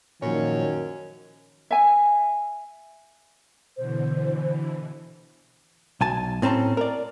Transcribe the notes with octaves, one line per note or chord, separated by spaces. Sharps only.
F#2 A#2 D#3 F3 C#5
E5 G#5
B2 D3 E3 C5
B1 G#5 A5
A2 C4 C#4 A5 A#5
A#4 D5